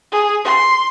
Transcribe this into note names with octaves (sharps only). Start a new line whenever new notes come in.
G#4
C6